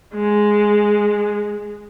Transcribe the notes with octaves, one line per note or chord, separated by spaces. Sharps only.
G#3